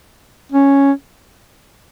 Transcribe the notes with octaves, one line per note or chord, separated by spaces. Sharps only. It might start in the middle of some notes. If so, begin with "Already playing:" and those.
C#4